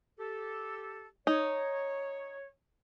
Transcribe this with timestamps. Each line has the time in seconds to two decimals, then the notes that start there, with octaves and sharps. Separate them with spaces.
0.19 G4 A4
1.27 D#4 C#5